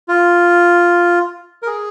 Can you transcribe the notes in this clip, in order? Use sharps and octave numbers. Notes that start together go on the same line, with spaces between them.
F4
A#4
G#4